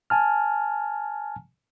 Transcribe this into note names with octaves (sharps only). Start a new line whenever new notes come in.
G#5 A5 F6